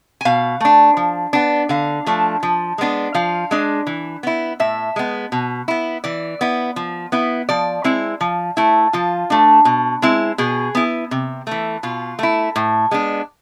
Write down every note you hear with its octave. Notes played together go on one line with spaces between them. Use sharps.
G#5
B2 F5
A3 D4
F3
B3 D4
D3 F5
F3 A3 D4
F3
G#3 B3 D4
F3 F5
G#3 D4
E3
B3 E4
A2 E5
G#3 B3
B2
B3 E4
E3 D5
B3 E4
F3
B3 E4
F3 D5
G#3 C4 E4
F3
A3 E4
F3 F4
A3 D4
B2
G#3 C4 E4
B2 G#4
B3 E4
C3
E3 A3
B2 F4
A3 E4
A2
G#3 B3 D4